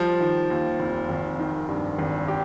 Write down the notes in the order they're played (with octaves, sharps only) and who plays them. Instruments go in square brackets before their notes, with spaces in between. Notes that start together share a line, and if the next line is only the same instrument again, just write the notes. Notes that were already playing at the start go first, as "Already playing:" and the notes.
Already playing: [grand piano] F3 [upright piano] G3
[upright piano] D#3
D#2
F1
G#1
D#3
G2
G#1
G4